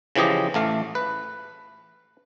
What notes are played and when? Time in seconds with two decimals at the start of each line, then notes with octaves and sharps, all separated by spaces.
0.16 C#3 E3 F3 G4 D#5
0.54 A1 A3 F5
0.95 B4